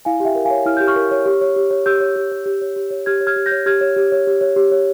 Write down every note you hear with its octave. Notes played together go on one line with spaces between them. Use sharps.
E4 F5 G#5
G4
E5 G5
A#4
F5 G#5
C#5
E4 F6
G4 G6
C#6 F6
A#4
C#5
G4
C#5
G4
C#5
G4 E6 G6
C#5
G4
C#5
G4
C#5
G4
C#5
G4 F6 G#6
C#5
F6 G#6
G4
G6 A#6
C#5
G4 F6 G#6
C#5
G4
C#5
G4
C#5
G4
C#5